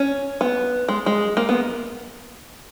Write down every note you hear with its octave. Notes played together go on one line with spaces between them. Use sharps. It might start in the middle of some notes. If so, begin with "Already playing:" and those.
Already playing: C#4
B3
G#3
G#3
A#3
B3